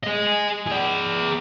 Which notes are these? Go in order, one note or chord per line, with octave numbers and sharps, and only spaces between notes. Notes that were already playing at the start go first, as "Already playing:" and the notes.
G#4 D#5
G#4 D5